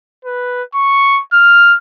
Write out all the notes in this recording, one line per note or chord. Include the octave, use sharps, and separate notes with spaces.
B4
C#6
F6